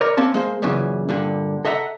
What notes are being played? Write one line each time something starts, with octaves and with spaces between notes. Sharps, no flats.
A#4 C#5 D5
A#3 C4 C#4 A5
G#3 A#3 C5
F#2 A#2 C#3 E3
G2 A#2 D3
A4 D#5 E5 F#5 A#5